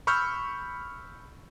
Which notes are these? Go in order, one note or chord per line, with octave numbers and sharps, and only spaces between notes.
B5 C#6 E6 F6 G6